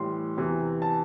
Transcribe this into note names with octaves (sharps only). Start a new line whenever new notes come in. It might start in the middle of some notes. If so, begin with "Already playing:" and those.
Already playing: A2 E3 G3 C6
E2 C3 E3
A5